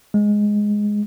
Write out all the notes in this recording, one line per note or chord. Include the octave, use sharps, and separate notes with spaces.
G#3